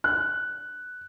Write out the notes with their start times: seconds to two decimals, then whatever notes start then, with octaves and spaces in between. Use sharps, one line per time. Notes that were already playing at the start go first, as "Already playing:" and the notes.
0.04 F#6